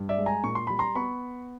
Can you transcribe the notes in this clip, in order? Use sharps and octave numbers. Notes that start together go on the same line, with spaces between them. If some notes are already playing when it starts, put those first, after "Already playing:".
Already playing: G2
D5 E5
G#3
G#5 A#5
A#2 C#6
C6
G3 B5
A#5 C6
B3 B5 C#6